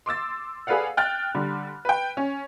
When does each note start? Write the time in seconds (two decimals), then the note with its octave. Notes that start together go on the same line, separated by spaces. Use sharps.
0.06 C6 D6 E6 A6
0.67 G#4 A4 B4 D5 F5 F#5
0.97 G5 F6 F#6 A6
1.35 D3 G3
1.85 B4 G5
2.17 C#4